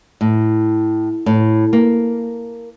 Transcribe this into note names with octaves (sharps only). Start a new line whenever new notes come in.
A2
A2
A#3